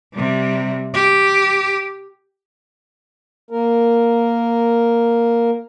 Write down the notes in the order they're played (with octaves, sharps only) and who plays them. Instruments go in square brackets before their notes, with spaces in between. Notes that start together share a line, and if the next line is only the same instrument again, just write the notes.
[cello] C3 G3
G4
[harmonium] A#3 A#4